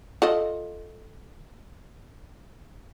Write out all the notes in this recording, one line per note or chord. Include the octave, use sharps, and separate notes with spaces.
F4 A4 D#5